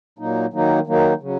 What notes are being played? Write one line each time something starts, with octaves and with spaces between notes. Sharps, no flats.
A#2 F#3 A#3 D#4
D#3 F#3 A#3 D#4
D#3 F#3 A#3 D#4
C#3 F#3